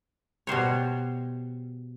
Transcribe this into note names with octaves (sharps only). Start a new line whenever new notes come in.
B2 G3 C5 C#5